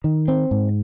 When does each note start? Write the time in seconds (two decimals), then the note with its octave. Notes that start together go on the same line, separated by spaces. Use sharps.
0.04 D#3
0.28 C4
0.51 G#2